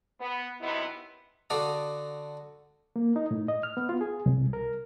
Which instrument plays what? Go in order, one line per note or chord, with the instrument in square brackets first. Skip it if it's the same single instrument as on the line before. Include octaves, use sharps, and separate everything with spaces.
[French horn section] B3
F#2 C3 B3 D#4 E4
[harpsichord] D3 F#4 A4 D5 F5 D#6
[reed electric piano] A#3
D#4
A2
D#5
F6
B3
F4
G#4
C2
A#4